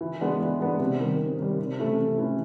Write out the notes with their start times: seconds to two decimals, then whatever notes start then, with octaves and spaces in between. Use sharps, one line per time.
0.01 E3
0.21 G#3 B3 D4
0.40 E3
0.60 G#3 B3 D4
0.79 C3
1.00 D#3 G3
1.19 C3
1.39 D#3 G3
1.59 C3
1.79 E3 A3 C#4
1.99 C3
2.18 E3 A3 C#4